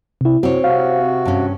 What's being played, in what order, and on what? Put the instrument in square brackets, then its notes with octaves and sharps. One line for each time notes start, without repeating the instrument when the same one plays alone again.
[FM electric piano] C3 E4
[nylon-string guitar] C4 C#5 [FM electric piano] F#4
[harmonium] C3 F#4 [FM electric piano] F5
[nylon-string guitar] G2 C#4